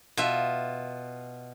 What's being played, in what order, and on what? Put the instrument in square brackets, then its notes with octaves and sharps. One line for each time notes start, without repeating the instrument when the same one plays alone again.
[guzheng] B2 F4 E5